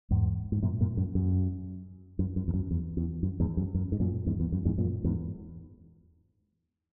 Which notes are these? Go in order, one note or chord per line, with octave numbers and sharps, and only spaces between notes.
E2 G#2
G#2
F#2 A#2
F#2 A#2
F#2
F#2
F#2
F#2
E2
F#2
E2
E2
F#2
E2 G#2
F#2
F#2
G#2
F#2 A#2
E2 G#2
E2
F#2
E2 G#2
F#2 A#2
E2 G#2